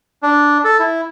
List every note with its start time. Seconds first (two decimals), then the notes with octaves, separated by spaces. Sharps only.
0.23 D4
0.64 A4
0.79 E4